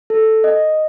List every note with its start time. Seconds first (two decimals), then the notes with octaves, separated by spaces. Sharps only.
0.10 A4
0.44 D#5